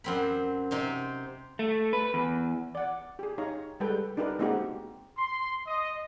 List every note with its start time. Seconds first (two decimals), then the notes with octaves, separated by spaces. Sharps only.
0.04 F#2 C4 B5
0.71 C3 D#4 C5
1.59 A3
1.93 B4
2.14 E2
2.75 D5 F#5
3.19 G4 G#4
3.38 D#4 C#5 F5 A#5
3.80 G3 G#3 A4 B4 G5
4.17 D4 D#4 G4 A#4 B4
4.39 G#3 A#3 C4 D#4 F#4 G4
5.17 C6
5.67 D#5